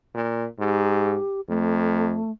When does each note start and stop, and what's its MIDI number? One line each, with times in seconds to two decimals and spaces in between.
0.15 0.46 46
0.59 1.17 44
0.59 1.41 67
1.49 2.18 41
1.49 2.31 57